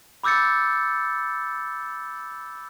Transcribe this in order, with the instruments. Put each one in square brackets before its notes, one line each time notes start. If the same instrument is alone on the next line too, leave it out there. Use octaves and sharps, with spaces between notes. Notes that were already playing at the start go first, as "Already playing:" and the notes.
[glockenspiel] B5 D6 E6 G6 A6 C#7